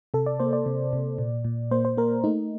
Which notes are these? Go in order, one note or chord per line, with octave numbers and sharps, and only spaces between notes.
C3 A4
D5
A#3 C5
D5
C3
C3
A#2
A#2
A#3 C5
C5
A#3 A#4
A3 D#4